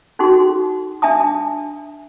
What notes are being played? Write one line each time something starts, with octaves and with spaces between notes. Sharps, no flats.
C#4 D#4 F#4 G#4 A4 C6
D4 E5 G#5 A5 D#6